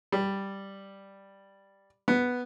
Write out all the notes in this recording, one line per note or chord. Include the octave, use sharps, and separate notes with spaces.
G3
B3